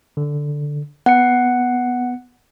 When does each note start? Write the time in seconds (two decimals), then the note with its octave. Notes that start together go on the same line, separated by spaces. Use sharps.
0.17 D3
1.06 B3 F#5 C#7